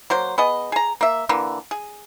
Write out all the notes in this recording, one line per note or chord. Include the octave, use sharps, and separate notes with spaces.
F#3 A#3 C5
B3 G#4 D#5
G#4 A#5
A#3 E5
D3 E3 A#3
G#4